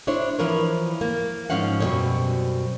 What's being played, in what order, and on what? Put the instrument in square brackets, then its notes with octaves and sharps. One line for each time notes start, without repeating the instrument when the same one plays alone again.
[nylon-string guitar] D4 E4 C5 C#5
E3 F3 F4 A#4 B4 C#5
A#3
G#2 F3 C#4 F5 F#5
F#2 B2 G3 A3 C4 C#5